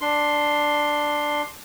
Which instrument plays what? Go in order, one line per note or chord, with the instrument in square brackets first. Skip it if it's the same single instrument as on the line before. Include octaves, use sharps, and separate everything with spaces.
[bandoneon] D4 C6